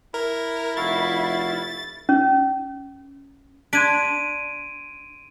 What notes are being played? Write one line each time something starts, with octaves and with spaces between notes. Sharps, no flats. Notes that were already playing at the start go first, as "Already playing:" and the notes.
E4 A#4
F1 F#4 E5 F5 A6
C#4
D4 C6 G#6 B6 D7 D#7